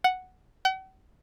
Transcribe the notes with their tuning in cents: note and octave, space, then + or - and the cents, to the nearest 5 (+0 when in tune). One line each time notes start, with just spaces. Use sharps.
F#5 +0
F#5 +45